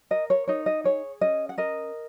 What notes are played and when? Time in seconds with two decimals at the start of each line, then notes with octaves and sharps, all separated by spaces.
0.11 A#4 D#5
0.30 C#5
0.48 D#4 C#5
0.66 D#5
0.84 G#4 C#5
1.21 C#4 D#5
1.49 F#5
1.58 A#4 D#5